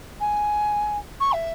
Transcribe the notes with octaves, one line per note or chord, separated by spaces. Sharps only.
G#5
C#6
E5